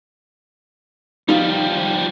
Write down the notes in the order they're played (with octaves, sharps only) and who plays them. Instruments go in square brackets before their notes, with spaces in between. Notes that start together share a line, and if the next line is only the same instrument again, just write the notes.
[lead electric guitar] F3 G3 [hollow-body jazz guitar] D#4 F4 G4